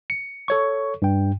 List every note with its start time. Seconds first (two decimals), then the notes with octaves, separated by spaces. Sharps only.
0.10 C#7
0.48 A4 C#5 C#6
1.02 G2 G5